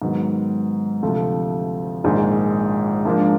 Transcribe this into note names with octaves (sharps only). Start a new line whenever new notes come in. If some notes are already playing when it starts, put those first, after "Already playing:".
G#2 D#3 F#3 B3
D2 C3 F3 A3
A#1 G#2 D#3 G#3
G#2 F3 A#3 D4